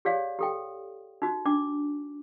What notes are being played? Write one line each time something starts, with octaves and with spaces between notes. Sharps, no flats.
G4 G#4 C#5 D5 F5
G4 A4 G5
D#4 F#4
D4 D6